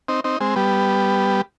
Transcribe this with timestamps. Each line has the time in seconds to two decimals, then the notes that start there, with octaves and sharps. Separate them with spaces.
0.08 C4 D#4
0.24 C4 D#4
0.40 G#3 C4
0.56 G3 B3